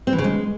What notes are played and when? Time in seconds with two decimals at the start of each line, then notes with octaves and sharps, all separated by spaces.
0.07 C4
0.13 E3
0.18 C#3
0.24 G#3